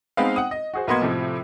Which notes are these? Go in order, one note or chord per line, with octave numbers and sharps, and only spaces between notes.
G#3 B3 C4 D#4 B4 F5
F#5 G5 D#6
D#5
F#4 G#4 C5
B1 A#3 B3 D#5 C6 G#6
A2 C3 F3